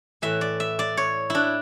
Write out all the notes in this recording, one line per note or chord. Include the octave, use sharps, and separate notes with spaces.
A2 E3 E5
D5
E5
D5
C#5
D4 E4